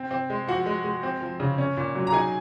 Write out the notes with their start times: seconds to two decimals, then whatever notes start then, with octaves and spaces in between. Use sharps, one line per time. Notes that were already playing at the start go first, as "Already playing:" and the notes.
Already playing: C4
0.11 C4
0.30 G#3
0.47 F3 F#4 F#5
0.66 G#3
0.84 G#3
1.03 C4
1.21 F3
1.40 C#3
1.58 C#4
1.77 A#2
1.95 F#3
2.07 A#5
2.13 D#4 G#4 G#5